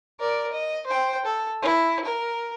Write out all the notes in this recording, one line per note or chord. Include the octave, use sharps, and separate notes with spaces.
A#4 D5
D#5
C5 G5
A4
E4
A#4